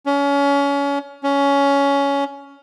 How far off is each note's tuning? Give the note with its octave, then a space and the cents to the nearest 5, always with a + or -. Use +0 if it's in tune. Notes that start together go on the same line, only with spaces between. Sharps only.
C#4 +30
C#4 +15